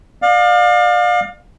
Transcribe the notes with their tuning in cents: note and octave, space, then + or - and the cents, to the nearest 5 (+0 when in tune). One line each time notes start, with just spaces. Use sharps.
D5 +35 F5 +30